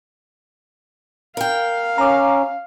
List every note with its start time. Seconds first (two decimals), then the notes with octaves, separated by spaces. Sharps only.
1.37 A#4 F5 G5
1.98 C#4 A#5 D6